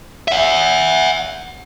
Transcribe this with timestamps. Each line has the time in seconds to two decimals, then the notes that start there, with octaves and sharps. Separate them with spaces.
0.28 E5 F#5